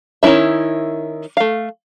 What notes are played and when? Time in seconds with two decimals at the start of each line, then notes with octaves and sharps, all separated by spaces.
0.23 D#3 C#4 E4 B4 E5
1.37 A3 F5